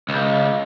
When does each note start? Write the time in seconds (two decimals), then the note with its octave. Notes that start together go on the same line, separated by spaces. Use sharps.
0.09 C#2